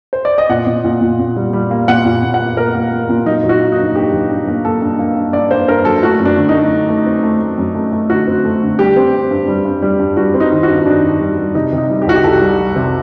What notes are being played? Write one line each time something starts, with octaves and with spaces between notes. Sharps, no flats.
C5
D5
D#5
A#2 F#5
A#2
A#2
A#2
A#2
G3
G3
A#3
A#2 F#5
A#2
A#2
F#5
A#3
A#3 A#4
A#3
A#3
A#2
F#3 D#4
F#3
F#4
A#3
D#4
G2
G2 G4
F#3
G2
A#3
A#3 A4
G2
A#3
G2
G2 D5
A#3 C5
G2 A#4
F#3 A4
A3 F#4
F#2
D4
D3
D#4
A3
D3
A3
C4
A3
A3
F#2
A3
A3
D3 F#4
C4
A3
D3
G3 G4
C4
C4
G2
G3
G2
G3
G2
G3 F#4
C4
D#4
D#3
F#4
G2
D#3 D4
G2
G3
G3
C3 D#4
C3
D#4
G3
G4
C2 F#4
G4
C2 A4
G3
G3
C3